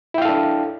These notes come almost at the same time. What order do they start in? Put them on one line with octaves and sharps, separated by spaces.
E4 G5 F5 A4 D4